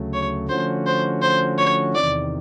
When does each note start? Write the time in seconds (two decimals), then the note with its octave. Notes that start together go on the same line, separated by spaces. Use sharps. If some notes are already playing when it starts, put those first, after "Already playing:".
Already playing: D2 C#3 F#3 A3
0.14 C#5
0.49 D3 F3 A3 C#4 F#4 C5
0.86 C5
1.22 C5
1.58 C#5
1.94 E2 C3 D#3 D5